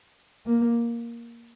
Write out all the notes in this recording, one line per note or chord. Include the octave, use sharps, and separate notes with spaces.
A#3